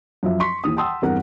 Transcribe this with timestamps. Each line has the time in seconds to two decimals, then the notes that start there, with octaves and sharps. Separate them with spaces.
0.23 F#2 F3 E5
0.40 C6 C#6 B6
0.64 D#2 E3 D#6
0.76 F#5 G5 A5 C6 D#6 E6
1.02 E2 G2 C4 A#4 F#5